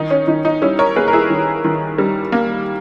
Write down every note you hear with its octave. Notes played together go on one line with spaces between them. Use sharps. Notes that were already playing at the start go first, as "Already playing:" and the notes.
Already playing: D#3 D#4
C#4
D#3 D#4
D#4
G3 C#4 E4
A#4 C#5
A#3 G#4 B4
A#4
E4 G#4
D#3
D#3
G3
A#3